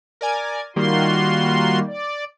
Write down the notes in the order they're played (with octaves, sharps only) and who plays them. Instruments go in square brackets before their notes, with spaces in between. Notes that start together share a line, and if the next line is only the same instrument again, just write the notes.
[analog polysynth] A#4 D5 G#5
[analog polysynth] D#3 G3 A#3 [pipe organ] F4 F#4 C6
[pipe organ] D5